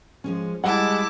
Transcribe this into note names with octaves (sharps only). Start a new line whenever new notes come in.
F3 G#3 C#4
G3 G#3 E4 F#5 A5 D6